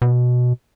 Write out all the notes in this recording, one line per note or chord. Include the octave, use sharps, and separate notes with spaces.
B2